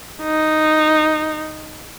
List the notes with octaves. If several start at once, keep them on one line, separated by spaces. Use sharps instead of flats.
D#4